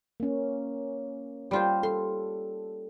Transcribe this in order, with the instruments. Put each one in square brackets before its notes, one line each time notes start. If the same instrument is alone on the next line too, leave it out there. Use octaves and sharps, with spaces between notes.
[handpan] A#3 C#4
[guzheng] G3 F4 C5
[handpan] A4 [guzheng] C6